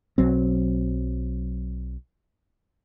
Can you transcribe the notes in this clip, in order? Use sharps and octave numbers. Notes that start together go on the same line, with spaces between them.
B1 F#3 C4